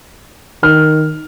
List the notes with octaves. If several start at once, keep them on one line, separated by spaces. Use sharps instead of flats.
D#3 F6